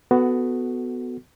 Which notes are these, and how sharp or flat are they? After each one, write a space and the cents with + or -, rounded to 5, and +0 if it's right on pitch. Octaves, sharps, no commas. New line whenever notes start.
B3 +15 F#4 +0 A4 +0